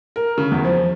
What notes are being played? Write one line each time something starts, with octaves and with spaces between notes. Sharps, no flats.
A#4
C#3
E2
F3